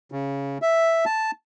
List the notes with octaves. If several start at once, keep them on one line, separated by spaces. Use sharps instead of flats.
C#3
E5
A5